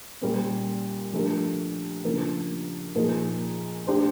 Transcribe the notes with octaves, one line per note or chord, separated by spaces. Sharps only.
A#2 G3 A#3 C#4
F3 A3 D4 G4 A#4
C#3 F3 A#3 D4
A#2 F3 A#3 D#4 G#4
A3 D4 G4 C5